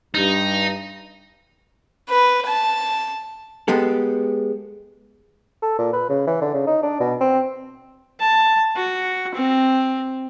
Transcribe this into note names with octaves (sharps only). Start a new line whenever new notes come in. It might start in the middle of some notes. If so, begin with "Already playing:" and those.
G2 D#4
B4
A5
G#3 B3 G4 A4
A4
A#2
B4
C#3
E3
D3
C#3
D#4
D4
B2
C4
A5
F#4
C4